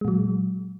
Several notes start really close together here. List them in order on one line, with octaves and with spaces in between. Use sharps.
G#3 A#2 F#3